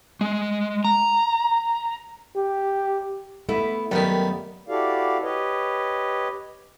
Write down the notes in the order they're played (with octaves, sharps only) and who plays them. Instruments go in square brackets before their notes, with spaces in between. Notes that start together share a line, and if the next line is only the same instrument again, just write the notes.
[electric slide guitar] G#3
A#5
[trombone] G4
[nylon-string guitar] A3 [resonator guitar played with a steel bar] B3 E4
[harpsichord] F#2 D#3 [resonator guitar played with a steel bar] G3 B3
[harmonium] E4 F#4 G4 A4 D5 F5
G4 B4 C#5 D#5